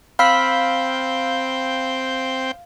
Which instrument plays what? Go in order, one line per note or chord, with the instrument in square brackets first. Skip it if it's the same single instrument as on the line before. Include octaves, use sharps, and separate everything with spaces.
[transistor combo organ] C4 G5 [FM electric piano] F5 [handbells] B5 E6 B6